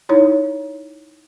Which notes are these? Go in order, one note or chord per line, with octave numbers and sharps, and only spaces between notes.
D#4 E4 C#5